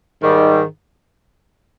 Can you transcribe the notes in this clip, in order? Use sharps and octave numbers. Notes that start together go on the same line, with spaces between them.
G#2 D#3 G3